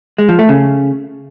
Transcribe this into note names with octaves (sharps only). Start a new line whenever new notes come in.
G#3
F3
A3
C#3